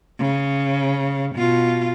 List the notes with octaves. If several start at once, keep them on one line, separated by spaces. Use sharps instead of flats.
C#3
B2 F4